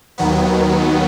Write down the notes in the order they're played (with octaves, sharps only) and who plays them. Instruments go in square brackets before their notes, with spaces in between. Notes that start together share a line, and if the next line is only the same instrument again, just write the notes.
[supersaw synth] D#2 D#3 F#3 B3